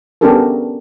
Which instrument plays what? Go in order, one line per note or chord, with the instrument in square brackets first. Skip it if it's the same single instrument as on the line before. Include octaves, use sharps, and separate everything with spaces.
[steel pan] B3 C#4 D4 G4 A4 A#4